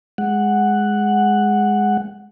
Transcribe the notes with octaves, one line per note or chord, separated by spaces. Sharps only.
G#3 F#5